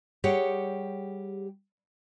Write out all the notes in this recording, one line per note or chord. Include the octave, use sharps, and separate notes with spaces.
G3 G4 G#4 C#5 F#5 G5